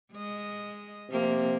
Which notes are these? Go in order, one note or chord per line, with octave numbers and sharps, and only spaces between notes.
G#3 D#5
C3 F3 A#3